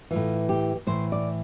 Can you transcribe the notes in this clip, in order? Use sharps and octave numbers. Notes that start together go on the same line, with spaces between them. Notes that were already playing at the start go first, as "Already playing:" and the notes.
A2 E3 F4
G4
A2 E3 C5
D5